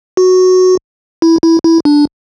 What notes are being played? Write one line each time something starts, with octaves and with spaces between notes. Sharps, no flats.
F#4
E4
E4
E4
D4